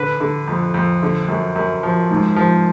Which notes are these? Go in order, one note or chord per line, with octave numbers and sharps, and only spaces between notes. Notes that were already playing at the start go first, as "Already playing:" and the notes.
Already playing: D3 B4
D3
F2
F2
D3
F#2
F#2
F3
G#2
F3